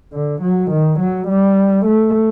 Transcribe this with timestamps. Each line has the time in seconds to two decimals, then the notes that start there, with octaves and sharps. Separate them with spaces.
0.13 D3
0.42 F#3
0.71 D#3
1.00 F#3
1.28 G3
1.86 A3